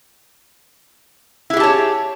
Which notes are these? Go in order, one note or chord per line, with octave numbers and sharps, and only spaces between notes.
E4 G4 G#4 C#5 A5